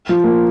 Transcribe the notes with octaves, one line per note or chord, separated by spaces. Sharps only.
F3
A#3